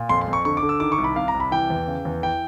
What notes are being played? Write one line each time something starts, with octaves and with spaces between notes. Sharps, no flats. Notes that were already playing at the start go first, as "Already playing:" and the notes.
Already playing: A#2
F2 C6
C6
F2
C#6
D3 C#6
D6
D3
E6
D#3 D6
C#6
C2
B5
C3 F5
A#5
C2
B5
E3 G5
E2
C#3
E2
E3 G5